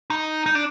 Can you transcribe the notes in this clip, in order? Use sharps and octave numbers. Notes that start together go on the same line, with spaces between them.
D#4
D#4
D4